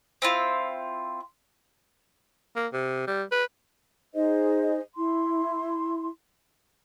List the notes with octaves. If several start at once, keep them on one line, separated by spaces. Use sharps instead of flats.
C4 E4 F4
A#3
C3
G3
B4
D#4 G#4 C5 D#5
E4 C6